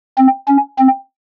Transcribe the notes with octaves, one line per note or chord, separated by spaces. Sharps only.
C4
C#4
C4